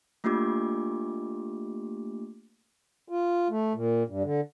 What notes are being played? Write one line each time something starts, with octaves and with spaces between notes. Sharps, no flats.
A3 A#3 D4 F4 G4 D6
F4
A3
A#2
G2
D3